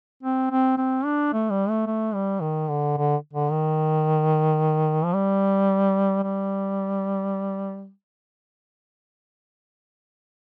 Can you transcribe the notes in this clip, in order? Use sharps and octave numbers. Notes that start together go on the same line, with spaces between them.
C4
C4
C4
D4
A3
G3
A3
A3
G3
D#3
D3
D3
D3
D#3
F3
G3
G3